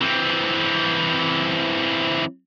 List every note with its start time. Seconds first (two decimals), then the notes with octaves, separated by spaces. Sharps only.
0.01 E3 C4